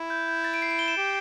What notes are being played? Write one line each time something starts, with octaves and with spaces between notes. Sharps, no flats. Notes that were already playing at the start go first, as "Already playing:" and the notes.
Already playing: E4
G6
G6
A6
D7
C7
D7
G7
E7
G4 D7